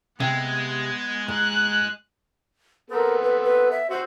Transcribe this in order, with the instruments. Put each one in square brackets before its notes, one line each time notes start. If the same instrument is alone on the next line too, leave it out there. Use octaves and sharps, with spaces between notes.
[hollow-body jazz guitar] C3 [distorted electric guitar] G#3 [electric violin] B3
[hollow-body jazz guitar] G#2 [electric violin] F#6
[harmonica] B3 C4 A4 [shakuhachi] A#4
[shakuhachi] B4
B4
E5
[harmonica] C4 F#4 [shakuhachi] C5